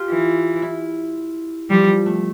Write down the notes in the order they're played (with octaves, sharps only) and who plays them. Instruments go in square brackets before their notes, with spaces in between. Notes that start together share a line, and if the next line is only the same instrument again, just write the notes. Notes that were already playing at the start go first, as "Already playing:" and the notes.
Already playing: [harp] F4 G4
[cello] E3
[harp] E4
[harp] F3 [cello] G3
[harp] G3
A3